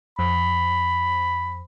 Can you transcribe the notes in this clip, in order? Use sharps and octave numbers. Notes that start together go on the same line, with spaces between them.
F2 B5